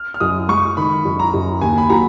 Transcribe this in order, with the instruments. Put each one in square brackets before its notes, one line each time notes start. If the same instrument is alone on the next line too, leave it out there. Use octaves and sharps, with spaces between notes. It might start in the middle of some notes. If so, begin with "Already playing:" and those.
Already playing: [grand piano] F6
F6
[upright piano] F#2 [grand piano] D#6
[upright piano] G#3 [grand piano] C#6
[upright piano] D#3 [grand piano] B5
[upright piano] F#2
[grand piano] A#5
[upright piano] F#2
[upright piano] D#2 [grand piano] G#5
[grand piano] B5
[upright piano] F#3 [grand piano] A#5